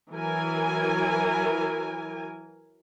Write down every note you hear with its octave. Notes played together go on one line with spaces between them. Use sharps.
E3 F#3 A#4 G#5